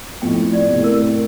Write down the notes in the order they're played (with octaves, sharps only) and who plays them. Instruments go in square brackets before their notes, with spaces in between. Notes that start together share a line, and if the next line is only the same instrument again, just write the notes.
[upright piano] F2 A2 [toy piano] G5
[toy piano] D5
[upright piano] A2 C3
[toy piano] A#4